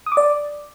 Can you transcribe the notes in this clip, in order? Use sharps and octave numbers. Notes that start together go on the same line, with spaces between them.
D#6
D6
D5